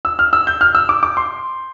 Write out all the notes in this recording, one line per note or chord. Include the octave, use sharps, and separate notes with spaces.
E6
F6
E6
G6
F6
E6
D6
D6
C6